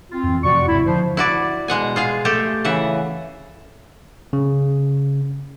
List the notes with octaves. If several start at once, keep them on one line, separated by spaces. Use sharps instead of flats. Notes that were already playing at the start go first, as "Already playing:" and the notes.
C4 F4
F2 E3
F2 C3 F3 F#4 D5 C#6
G1 D2 C3 E4
D3 F3 C5
E4 F#4 D5
B2 G#3 F#5 G#5
F4 G#4 F5
A3 G4 A4
C#3 E3 E5 F#5
C#3